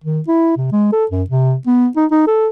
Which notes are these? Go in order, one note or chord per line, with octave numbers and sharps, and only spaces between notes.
D#3
E4
C3
G#3
A4
F#2
C3
B3
D#4
D#4
A4